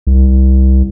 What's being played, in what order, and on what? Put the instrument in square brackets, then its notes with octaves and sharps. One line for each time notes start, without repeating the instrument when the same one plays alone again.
[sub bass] C2